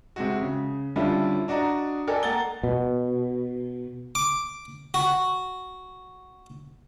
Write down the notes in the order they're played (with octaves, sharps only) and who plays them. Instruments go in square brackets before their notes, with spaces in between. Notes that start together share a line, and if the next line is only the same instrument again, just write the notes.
[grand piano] C3 G#3 F#4
C#3
D3 G3 C#4 D4 E4 F4
D4 F#4 D5 D#5 A#5
A4 A#4 D5 D#5 G5 G#5
A#3 F#5 A#5 A6 G7
[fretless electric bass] B2
[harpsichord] D6
F#4